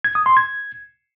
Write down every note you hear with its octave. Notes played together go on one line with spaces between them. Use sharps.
G#6
D#6
C6
G#6